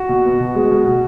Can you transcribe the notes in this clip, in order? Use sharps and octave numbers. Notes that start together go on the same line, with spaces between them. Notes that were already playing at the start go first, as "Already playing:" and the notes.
Already playing: F#4
B2
B3
B2
G#3
B2
B2